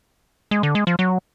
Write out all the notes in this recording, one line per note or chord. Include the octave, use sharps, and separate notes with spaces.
G#3
D3
G#3
F3
F#3